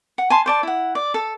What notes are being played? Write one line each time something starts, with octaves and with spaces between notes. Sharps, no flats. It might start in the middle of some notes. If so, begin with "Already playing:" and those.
F#5
G#5 A5 C6
C5 D5 A5
E4 F#5
D5
A4